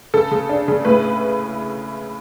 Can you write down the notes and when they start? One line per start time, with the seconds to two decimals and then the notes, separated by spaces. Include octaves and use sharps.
0.14 C#3 A4
0.31 C#3
0.49 D4
0.68 C#3
0.85 A2 B4